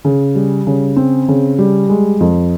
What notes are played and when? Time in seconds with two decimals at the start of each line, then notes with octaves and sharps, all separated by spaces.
0.05 C#3
0.35 G3
0.67 C#3
0.96 C4
1.28 C#3
1.58 G3
1.89 G#3
2.20 F2